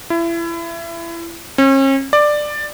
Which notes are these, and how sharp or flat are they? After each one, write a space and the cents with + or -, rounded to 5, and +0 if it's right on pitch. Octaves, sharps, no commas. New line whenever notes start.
E4 +30
C#4 -40
D5 +15